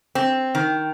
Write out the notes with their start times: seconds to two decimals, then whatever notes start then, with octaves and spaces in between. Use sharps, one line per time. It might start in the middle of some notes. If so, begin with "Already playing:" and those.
0.15 C4
0.55 D#3